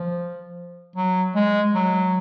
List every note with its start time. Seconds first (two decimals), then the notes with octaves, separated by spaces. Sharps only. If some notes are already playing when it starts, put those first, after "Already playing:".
Already playing: F3
0.96 F#3
1.35 G#3
1.74 F#3